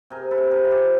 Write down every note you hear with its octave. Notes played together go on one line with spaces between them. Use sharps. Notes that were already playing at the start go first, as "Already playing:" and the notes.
C3 G#4 A#4
A4 B4
C3
G#4 A#4
F3
G4 A4